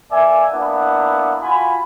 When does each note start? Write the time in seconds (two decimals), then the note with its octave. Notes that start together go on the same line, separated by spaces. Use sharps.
0.11 A#3 D5 E5 G#5
0.51 A#3 B3 D4 E4 F#5
1.41 F4 F#4 G#5 B5